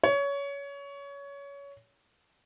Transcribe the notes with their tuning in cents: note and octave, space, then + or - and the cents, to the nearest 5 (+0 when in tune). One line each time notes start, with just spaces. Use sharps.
C#5 +20